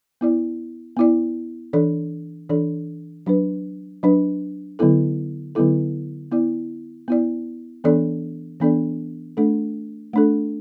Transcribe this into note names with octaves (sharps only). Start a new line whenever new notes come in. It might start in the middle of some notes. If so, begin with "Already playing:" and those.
B3 E4 D5
B3 E4 D5
E3 D4 A4 D5
E3 D4 A4 D5
F#3 D4 B4
F#3 D4 B4
D3 F#3 B3 E4 A4
D3 F#3 B3 E4 A4
B3 E4 D5
B3 E4 D5
E3 B3 D4 A4 D5
E3 B3 D4 A4 D5
A3 D4 A4
A3 D4 A4